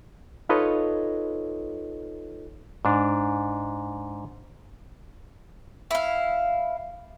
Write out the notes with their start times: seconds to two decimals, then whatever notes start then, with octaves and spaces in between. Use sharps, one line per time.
0.49 D#4 F4 A4 B4 C#5 D#5
2.85 G#2 D4
5.91 E4 F5